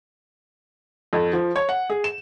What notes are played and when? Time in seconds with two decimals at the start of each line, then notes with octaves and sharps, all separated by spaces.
1.13 F2
1.33 F3
1.56 C#5
1.69 F#5
1.90 G#4
2.04 E7